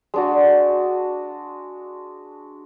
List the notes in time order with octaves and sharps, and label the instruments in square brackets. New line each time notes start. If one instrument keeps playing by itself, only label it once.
[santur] G#3 D4 F#4